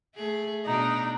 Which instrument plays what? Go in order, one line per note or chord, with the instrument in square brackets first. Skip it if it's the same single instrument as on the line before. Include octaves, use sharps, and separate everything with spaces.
[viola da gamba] A3 G#4
[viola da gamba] B2 D4 [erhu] D#4